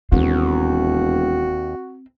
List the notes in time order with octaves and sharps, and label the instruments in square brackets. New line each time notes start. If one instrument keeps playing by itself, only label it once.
[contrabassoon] E1 [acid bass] D#2 [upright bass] C4 [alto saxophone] F#4